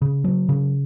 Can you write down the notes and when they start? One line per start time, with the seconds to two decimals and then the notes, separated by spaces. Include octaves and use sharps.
0.02 C#3
0.24 F#3
0.49 C#3